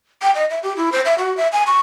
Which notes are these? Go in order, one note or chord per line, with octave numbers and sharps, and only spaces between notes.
G5
D#5
E5
G4
E4
C5
E5
F#4
E5
G#5
C#6